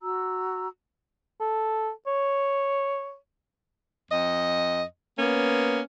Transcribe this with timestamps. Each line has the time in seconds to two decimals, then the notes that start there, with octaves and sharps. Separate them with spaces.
0.01 F#4 A#5 E6
1.40 A4
2.07 C#5
4.10 F2 D#5
5.17 A#3 B3 C#4